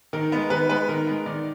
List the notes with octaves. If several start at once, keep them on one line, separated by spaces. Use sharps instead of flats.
D#3 A#4
G#3 B3
D#3 B4
G#3 B3 B4
D#3 A#4
G#3 B3
D#3 D5